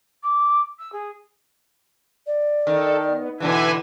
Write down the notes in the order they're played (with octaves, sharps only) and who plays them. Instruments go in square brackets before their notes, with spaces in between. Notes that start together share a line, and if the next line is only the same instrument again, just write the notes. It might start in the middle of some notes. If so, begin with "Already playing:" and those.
[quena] D6
E6
G#4
[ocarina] D5
[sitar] D#3 [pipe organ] A4
[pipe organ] B3
[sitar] B2 D3 E3 [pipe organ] B4 E5 G#5